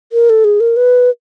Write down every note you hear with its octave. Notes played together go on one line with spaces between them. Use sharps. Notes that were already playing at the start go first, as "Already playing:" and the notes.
A#4
A4
G#4
A#4
B4